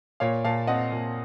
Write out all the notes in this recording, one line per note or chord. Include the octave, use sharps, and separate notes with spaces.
A#2 C#5 F5
A#2 F5 A5
C4 D#5 F#5
A#2